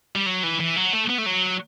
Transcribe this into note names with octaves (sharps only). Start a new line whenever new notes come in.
G3
F#3
E3
E3
F#3
A3
B3
A3
F#3